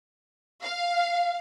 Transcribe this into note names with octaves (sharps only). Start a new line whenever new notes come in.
F5